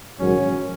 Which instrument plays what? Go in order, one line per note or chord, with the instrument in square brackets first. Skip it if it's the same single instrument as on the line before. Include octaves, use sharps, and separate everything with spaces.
[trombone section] A#1 G#2 D#3 F#3 [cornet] C#4